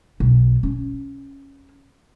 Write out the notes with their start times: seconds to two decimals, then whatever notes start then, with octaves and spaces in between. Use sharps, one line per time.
0.20 B1
0.63 C#4